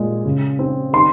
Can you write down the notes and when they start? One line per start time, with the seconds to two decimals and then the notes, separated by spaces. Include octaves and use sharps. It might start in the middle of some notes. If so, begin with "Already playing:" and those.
Already playing: A#2 G#3
0.25 C#3
0.59 C4
0.93 D#3 C6